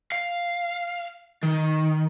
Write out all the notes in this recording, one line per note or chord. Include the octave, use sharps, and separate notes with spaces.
F5
D#3